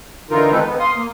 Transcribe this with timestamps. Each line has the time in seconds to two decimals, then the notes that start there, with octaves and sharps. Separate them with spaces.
0.31 D3 E3 D#4 F4 A#4
0.51 D#3 G#3 C4 D#4 A4 B4
0.64 B3
0.80 F5 C6 D#6
0.96 A#3